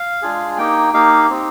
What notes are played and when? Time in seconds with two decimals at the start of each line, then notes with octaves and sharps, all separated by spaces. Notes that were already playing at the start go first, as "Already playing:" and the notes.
Already playing: F5
0.22 G#3 D4 F4 G#4
0.58 A#3 D#4 G4 G5
0.93 A#3 D#4 G4 F5
1.30 C4 D#4 G4